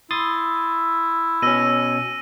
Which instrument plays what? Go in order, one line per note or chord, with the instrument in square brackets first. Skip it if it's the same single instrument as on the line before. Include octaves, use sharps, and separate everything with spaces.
[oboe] E4 [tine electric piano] C6 D#6 A6
[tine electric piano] B2 C#4 [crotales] E6 A#6 D#7